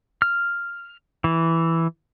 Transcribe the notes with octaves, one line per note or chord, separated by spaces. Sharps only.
F6
E3